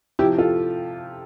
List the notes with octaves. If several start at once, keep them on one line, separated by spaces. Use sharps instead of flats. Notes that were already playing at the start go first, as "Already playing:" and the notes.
C3 F3 E4 G4
F4 A4